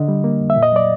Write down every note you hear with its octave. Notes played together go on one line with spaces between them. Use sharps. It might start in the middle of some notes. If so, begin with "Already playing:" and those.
Already playing: D3 D#5
G3
A#3
F2
E5
A#2
D#5
F#3 D5